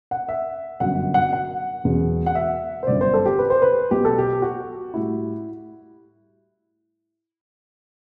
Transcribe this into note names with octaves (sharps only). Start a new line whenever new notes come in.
F#5
E5
G1 F#2 F#3 F#5
F#5
F#5
E1 E2 B2 F#3
F#5
E5
C5
G1 F#2 D3 D5
C5
A4
G4
B4
C5
B4
B1 B2 F#3 G4
A4
G4
F#4
A2 G3 E4